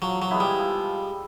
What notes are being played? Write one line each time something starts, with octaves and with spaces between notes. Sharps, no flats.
F3 F#3
F#3
G#3 B3 E4
G3
F3